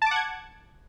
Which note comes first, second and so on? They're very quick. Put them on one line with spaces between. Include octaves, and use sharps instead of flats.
A5 D6 F#5 G#6